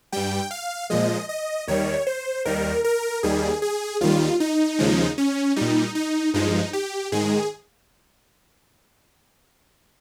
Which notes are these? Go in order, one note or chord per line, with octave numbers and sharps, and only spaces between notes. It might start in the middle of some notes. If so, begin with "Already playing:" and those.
G2 G3 G5
F5
A#2 F3 G#3 D#5
D#5
D#2 D#3 G3 C#5
C5
D#2 D#3 G3 A#4
A#4
D#2 D#3 G3 G#4
G#4
D#2 D#3 G3 F4
D#4
D#2 C#3 F3 G#3
C#4
A#2 G3 D#4
D#4
G2 F3 G#3 D#4
G4
G#2 D#3 G#3 G#4